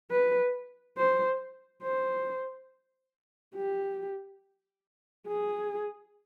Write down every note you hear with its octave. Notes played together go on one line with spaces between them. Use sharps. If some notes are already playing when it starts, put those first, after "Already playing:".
B4
C5
C5
G4
G#4